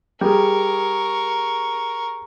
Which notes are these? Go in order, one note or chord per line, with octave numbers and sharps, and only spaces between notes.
G3 G#4 A#4 C#6